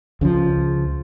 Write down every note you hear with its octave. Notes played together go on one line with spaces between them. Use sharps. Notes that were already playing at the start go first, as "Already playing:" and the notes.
C#2 C#3 E3 F3